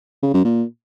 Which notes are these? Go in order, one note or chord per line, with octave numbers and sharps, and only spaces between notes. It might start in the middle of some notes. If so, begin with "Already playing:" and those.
C#3
F#2
A#2